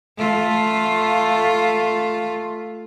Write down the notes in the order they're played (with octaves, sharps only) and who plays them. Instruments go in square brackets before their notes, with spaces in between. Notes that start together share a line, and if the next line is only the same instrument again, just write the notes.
[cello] A3 F4